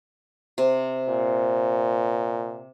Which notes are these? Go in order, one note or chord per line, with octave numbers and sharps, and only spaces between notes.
C3
A#2